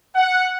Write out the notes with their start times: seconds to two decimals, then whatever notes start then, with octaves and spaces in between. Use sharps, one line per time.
0.16 F#5